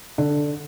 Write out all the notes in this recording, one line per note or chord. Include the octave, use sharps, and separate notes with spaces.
D3